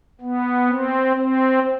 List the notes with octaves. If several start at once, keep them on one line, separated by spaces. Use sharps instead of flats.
B3
C4
C4